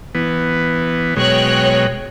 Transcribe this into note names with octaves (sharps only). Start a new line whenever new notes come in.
E3 B3
B2 F#3 G#3 C#5 G5 F#6